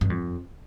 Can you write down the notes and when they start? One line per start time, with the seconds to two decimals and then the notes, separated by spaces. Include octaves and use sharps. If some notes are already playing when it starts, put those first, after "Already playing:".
0.01 G2
0.10 F2